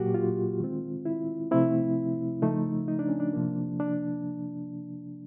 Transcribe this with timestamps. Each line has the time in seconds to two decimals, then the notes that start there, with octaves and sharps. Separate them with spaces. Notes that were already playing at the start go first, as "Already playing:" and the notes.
Already playing: A#2 F#3 A#3 F#4 G4
0.14 F4
0.60 D#3 G#3 C4
1.05 E4
1.51 C3 F3 A3 C4 E4
2.42 C#3 F3 A3 D#4
2.88 D#4
2.99 D4
3.09 C#4
3.20 D4
3.33 C3 F3 A#3
3.80 D4